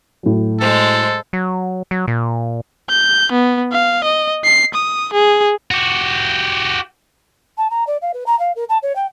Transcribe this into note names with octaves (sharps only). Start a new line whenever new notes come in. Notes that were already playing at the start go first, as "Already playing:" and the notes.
A2 F#3
G#3 A4 C5
F#3
F#3
A#2
G6
B3
F5
D#5
C7
D#6
G#4
F#4 G4
A5
A#5
D5
F5
B4
A#5
F5
A#4
A5
C#5
G5